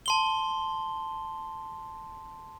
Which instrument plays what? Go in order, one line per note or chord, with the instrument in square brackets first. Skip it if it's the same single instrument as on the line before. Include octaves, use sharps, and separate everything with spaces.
[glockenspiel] A5 C6 G7